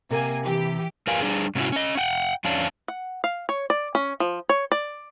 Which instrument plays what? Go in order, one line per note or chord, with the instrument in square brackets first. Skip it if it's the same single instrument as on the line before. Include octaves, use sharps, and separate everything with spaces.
[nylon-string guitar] C3 [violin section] A#3 G#5
[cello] E3 [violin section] G4
[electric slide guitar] F2 G4 A#4 B4 F5 G#5
G3 D4 G#4
G#2 C3 C#4 D#4 E4 F#4
C#4 D#5
F#5 G5
F2 C#4 D4 F5 A5
[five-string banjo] F#5
F5
C#5
D5
C#4
F3
C#5
D5